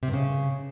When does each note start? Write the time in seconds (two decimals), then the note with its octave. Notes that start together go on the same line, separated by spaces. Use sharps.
0.03 C3
0.08 G2
0.13 C#3